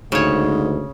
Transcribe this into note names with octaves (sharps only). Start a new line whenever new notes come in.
D2 G#2 C#3 C#5